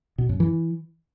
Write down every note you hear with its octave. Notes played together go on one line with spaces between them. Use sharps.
B2
F#2
E3